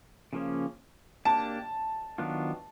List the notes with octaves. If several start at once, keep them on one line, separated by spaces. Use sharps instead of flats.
C#3 F3 A#3 C#4
A#3 D4 G4 A5
D#3 F#3 B3 D4 F4